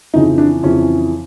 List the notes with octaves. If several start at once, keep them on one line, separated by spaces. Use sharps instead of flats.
F2 C#3 E3 D#4
D4
F2 C#3 E3 C#4